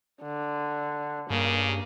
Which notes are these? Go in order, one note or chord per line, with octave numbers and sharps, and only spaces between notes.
D3
G2 C#3 A#3